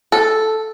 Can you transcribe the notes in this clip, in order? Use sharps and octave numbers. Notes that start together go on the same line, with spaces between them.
A4